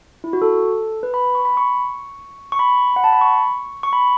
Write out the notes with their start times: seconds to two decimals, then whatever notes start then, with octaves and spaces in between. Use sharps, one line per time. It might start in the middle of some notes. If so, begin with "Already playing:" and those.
0.24 E4
0.33 F#4
0.42 A4
1.03 B4
1.14 B5
1.35 C#6
1.45 B5
1.57 C#6
2.52 C#6
2.59 B5
2.96 F#5
3.04 A5
3.13 B5
3.21 C#6
3.83 C#6
3.93 B5
4.01 C#6